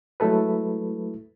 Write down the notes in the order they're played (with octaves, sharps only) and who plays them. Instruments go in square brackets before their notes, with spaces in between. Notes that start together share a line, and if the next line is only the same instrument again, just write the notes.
[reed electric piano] F#3 G#3 A3 E4 A4 B4